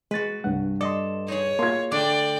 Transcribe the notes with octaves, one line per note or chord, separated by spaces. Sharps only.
G#3 F#4 B4 A6
C2 G2 F#5
A4 D5 D#5 C6
D#4 G#4 C#5
A#3 F4 C6 G#6
D3 A3 D4 D5 G5 D6